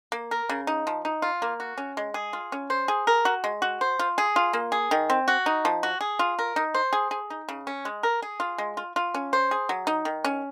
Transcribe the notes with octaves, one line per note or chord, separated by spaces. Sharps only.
A#3
A#4
C#3
D#4
F3
D#4
F4
A#3
F#4
C#4
G#3
G#4
F4
C#4
C5
G#4
A#4
F#4
G#3
F#4
C5
F4
G#4
F4
A#3
G#4
D#3
C4
F#4
D#4
F3
F#4
G#4
F4
A#4
D#4
C5
G#4
G#4
D#4
C#3
C#4
G#3
A#4
G#4
F4
G#3
F4
F4
C#4
C5
G#4
F#3
D#4
D#3
C#4